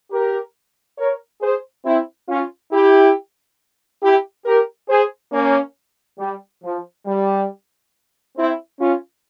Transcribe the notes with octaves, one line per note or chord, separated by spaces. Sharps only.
G4 A#4
A#4 C#5
G#4 C5
C4 E4
C#4 F4
E4 G4
E4 G4
G4 A#4
G#4 C5
A#3 C#4
G3
F3
G3
C4 E4
C#4 F4